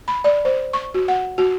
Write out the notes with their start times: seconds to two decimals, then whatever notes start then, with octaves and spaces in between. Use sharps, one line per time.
0.08 B5
0.24 D5
0.45 C5
0.73 C#6
0.94 F#4
1.08 F#5
1.38 F#4